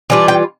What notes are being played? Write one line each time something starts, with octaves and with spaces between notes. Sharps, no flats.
E3 G3 D4 F4
G5